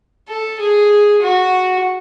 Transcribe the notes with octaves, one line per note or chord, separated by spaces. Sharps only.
A4
G#4
F#4